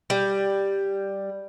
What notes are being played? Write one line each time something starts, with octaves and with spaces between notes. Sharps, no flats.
G3